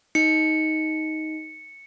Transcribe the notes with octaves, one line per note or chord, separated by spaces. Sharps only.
D#4 C#7